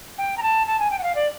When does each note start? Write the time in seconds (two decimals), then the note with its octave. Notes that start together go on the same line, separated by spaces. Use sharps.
0.18 G5
0.38 A#5
0.42 A5
0.67 A5
0.79 G#5
0.91 G5
0.99 F#5
1.03 F5
1.15 D5